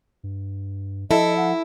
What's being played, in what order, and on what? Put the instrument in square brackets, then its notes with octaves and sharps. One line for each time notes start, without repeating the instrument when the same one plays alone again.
[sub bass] G2
[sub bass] F3 [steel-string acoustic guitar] E4 [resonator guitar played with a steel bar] A4 [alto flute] D#5
[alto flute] F#5